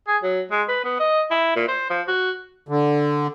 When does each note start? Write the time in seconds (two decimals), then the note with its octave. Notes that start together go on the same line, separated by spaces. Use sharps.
0.08 G#4
0.23 F#3
0.51 G#3
0.68 B4
0.84 B3
1.00 D#5
1.31 E4
1.56 A#2
1.68 C5
1.90 F3
2.08 F#4
2.69 D3